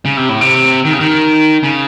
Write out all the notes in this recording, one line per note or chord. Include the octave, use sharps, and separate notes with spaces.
C#3
C3
A2
C3
D#3
C#3
D#3
C#3